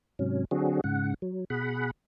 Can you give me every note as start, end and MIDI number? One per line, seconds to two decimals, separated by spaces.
0.19 0.45 44
0.19 0.45 48
0.19 0.45 54
0.19 0.45 61
0.51 0.81 50
0.51 0.81 54
0.51 0.81 60
0.51 0.81 62
0.51 0.81 66
0.51 0.81 68
0.84 1.14 44
0.84 1.14 49
0.84 1.14 78
1.22 1.45 54
1.50 1.91 47
1.50 1.91 68
1.50 1.91 78
1.50 1.91 83